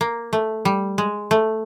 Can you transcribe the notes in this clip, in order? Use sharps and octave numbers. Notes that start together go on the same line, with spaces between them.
A#3
A3
G3
G#3
A3